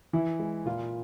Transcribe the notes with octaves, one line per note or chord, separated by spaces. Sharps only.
E3 E4
G#3
A#2 F4